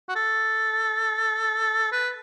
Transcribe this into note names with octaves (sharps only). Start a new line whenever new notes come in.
F#4
A4
B4